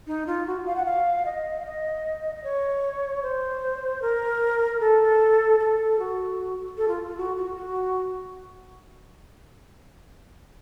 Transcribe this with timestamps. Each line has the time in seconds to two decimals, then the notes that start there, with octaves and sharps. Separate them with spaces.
0.07 D#4
0.27 F4
0.47 F#4
0.66 F5
0.76 F#5
0.85 F5
1.25 D#5
1.60 F5
1.65 D#5
2.35 D#5
2.44 C#5
3.22 C5
4.02 A#4
4.80 A4
5.60 A4
5.99 F#4
6.77 A4
6.88 F4
7.07 F4
7.17 F#4
7.37 F#4
7.57 F#4